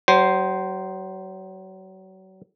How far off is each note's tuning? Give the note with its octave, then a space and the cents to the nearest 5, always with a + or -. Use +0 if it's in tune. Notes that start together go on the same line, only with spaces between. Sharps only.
F#3 +35 C5 +0